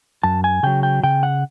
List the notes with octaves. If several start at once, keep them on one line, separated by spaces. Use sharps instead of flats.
F#2 A5
G#5
C#3 F#3 G5
G5
C#3 G5
F#5